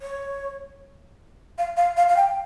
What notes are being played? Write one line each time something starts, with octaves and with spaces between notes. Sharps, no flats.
C#5
F5
F5
F5
F5
G5